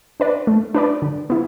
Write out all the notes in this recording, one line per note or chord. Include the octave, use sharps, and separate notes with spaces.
D4 B4 D5
A3
D4 B4 D5
D3
B3 E4